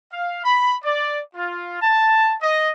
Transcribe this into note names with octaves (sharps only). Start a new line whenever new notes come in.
F5
B5
D5
F4
A5
D#5